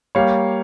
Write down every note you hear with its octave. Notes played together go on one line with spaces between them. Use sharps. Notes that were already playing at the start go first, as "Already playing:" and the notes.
G3 A#3 C#5 F5